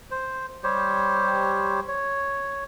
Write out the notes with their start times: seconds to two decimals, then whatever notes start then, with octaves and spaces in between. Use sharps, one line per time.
0.11 C5
0.63 G3 G4 C5 C#5
1.88 C#5